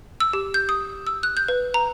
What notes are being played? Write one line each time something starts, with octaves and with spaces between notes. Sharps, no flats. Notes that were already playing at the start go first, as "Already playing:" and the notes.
E6
G4
G6
D#6
E6
F#6
G6
B4
A#5